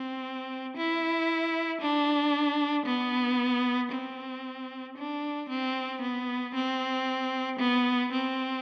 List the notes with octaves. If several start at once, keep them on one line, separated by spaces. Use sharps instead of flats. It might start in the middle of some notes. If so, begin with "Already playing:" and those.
Already playing: C4
E4
D4
B3
C4
D4
C4
B3
C4
B3
C4